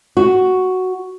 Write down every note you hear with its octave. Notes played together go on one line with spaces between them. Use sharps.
F#4